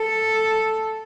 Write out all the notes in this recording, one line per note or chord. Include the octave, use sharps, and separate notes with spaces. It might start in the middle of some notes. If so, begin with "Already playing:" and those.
Already playing: A4